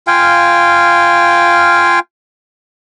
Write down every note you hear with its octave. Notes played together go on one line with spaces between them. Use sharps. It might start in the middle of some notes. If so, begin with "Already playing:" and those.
F4 F5 G5 G#5